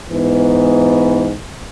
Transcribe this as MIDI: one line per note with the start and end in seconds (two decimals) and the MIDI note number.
0.10 1.32 44
0.10 1.32 52
0.10 1.32 59